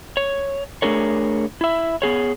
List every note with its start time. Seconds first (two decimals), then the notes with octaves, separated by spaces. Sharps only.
0.17 C#5
0.82 A3 D4 G#4 A#4 C#5
1.61 E4 E5
2.02 B3 G#4 C#5